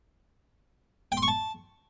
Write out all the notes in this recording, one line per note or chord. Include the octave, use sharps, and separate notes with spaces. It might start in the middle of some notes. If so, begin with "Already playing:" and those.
G5
C6
C#6
A5